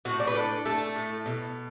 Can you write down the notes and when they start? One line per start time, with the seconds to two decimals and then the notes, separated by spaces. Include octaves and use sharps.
0.05 A2 F#4
0.20 D5
0.27 B4
0.35 D4 A4
0.65 A3 A4
0.96 A2
1.26 B2